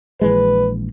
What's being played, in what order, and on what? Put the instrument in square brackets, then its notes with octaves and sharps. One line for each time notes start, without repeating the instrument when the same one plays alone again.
[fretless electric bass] A#1 E3 G#3 [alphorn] B4